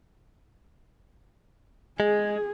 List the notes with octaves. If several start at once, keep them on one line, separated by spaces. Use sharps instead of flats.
G#3 G#4